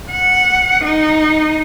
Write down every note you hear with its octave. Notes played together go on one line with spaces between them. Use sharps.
F#5
D#4